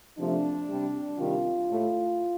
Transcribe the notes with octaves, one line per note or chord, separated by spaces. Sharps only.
C3 F3 A3 D4
C3 G3
C3 D#3 G3 F4
A2 A3